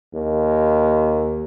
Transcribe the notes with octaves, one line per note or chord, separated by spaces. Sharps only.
D#2